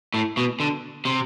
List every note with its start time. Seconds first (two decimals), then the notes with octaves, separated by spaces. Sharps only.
0.14 A2
0.37 B2
0.60 D3
1.05 C3